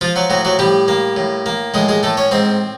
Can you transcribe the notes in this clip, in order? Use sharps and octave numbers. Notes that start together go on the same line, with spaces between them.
F3 F4
F#3 F#4
A2 F#3 F#4
F#3 F#4
A2 G3 G4
A#3
A2
A#3
A2 G#3 G#4
G#3 G#4
A2 A3 A4
C#4 C#5
G#2 C4 C5